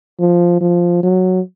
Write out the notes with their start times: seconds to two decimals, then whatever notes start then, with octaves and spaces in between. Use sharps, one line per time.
0.19 F3
0.61 F3
1.03 F#3